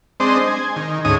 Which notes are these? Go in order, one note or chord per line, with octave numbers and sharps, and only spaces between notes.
G#3 C4 D4 C5 D#5
G#5
D#3
D2 G#2 C#4 D#5 G#5 D#6